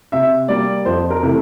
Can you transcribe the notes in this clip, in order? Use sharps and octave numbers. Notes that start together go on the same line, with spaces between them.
C3 E5
G3 A#3 D5
F2 C5
A#4
C3 E3 A3